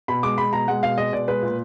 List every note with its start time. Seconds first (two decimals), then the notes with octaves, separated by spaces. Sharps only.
0.08 B2 B5
0.23 G#3 D6
0.38 G#3 B5
0.53 B2 A#5
0.68 G#3 F#5
0.83 B2 F5
0.98 G#3 D#5
1.12 B2 D5
1.28 G#3 B4
1.42 A#2